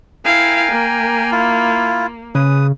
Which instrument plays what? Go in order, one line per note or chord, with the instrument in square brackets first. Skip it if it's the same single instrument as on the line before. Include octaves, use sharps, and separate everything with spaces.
[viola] E4 F5 [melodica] A#4 G5 G#5
[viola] A#3
[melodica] E4 F4
[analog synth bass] C#3 [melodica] B4 D#6